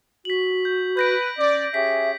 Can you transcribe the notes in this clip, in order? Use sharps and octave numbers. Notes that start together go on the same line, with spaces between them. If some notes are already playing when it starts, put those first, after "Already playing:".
F#4 B6 F#7
G6
B4 G6 A#6 D7
C#4 D5
C#4 G4 G#4 E5 B6